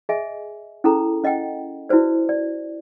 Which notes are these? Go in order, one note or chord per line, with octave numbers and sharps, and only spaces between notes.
G#4 D#5 E5 G#5
C#4 E4 G#4 A4 A#5
C#4 D#5 F#5 G5
E4 F#4 B4 C5 D5
D5